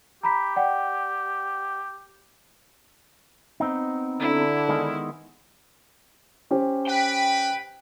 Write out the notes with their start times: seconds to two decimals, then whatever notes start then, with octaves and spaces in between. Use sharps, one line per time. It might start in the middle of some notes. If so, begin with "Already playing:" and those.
0.23 G4 A#5 B5 B6
0.56 D5 F#5 G5
3.60 B3 C4 D#4
4.20 D3 E4
4.69 D#3 G#3 B3
6.51 C#4 G4 C5
6.88 B4 G5 B5